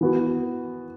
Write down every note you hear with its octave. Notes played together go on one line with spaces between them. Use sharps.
E3 B3 F#4